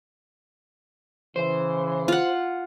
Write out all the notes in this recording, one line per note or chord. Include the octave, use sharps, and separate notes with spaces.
C#3 E3 C5
F4 F#5